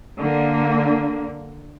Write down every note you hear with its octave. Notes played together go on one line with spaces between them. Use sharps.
D3 A#3